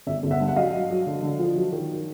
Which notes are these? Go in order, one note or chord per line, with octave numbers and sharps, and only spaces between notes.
G1 D5 E5
G1
E5 F#5
G2
F#5
F#3 D#5 F5
F#3
F#3
D3
D3
F3
F#3
D#3